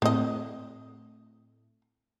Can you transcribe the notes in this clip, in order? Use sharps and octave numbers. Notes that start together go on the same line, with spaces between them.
A2 A3 C4 D#5